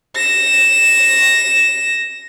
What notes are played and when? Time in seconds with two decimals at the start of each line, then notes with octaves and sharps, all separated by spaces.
0.16 A#6 E7